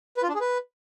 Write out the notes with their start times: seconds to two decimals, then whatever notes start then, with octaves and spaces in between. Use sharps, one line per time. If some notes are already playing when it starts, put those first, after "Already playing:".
0.17 B4
0.23 F4
0.29 D4
0.35 G#4
0.41 B4